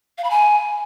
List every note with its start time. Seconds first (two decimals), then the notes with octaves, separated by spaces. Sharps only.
0.18 F5
0.24 B5
0.31 G#5